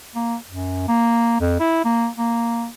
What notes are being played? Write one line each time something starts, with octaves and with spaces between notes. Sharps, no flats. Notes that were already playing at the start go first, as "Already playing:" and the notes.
A#3
F#2
A#3
F2
E4
A#3
A#3